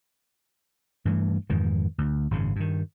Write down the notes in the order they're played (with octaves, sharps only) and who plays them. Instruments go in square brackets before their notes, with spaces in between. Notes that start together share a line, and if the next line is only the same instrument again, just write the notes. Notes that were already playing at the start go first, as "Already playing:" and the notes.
[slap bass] G2 E3 A3
F2 G#2 D#3 E3
D2
G#1 F#2 C#3
G2 D#3